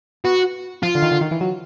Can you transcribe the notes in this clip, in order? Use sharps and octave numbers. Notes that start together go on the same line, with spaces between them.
B3 F#4
F3 F4
D3
D#3
D3
D#3
E3
F#3